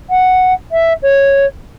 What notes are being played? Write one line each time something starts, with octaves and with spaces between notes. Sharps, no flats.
F#5
E5
C#5